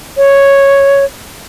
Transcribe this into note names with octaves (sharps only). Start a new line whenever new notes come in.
C#5